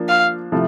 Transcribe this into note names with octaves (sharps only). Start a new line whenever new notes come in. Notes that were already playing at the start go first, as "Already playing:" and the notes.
Already playing: F3 A#3 D4 F4
F5
C3 F3 A3 E4